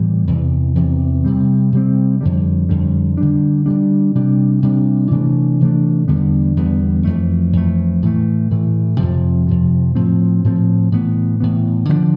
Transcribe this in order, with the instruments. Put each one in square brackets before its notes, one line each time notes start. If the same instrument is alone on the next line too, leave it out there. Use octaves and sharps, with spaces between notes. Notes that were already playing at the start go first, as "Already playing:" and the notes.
Already playing: [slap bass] A2 E3 G3 B3
E2 C3 E3
E2 C3 E3
C3 G3 C4
C3 G3 C4
F2 D3 G3
F2 D3 G3
D3 G3 D4
D3 G3 D4
C3 G3 D4
C3 G3 D4
C3 E3 A3 D4
C3 E3 A3 D4
E2 D3 G3 B3
E2 D3 G3 B3
F2 E3 A3
F2 E3 A3
A2 E3 A3
A2 E3 A3
F2 C3 F3
F2 C3 F3
A2 F3 C4
A2 F3 C4
A2 E3 B3
A2 E3 B3
D3 F3 B3 D4